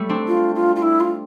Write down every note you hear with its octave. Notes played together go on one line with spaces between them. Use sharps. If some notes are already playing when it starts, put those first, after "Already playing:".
Already playing: G3 A3
C4 D4
F4
F4
F4
E4
F4